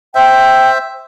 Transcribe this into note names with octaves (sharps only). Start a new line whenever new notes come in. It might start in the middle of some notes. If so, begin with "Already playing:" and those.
C5 E5 G5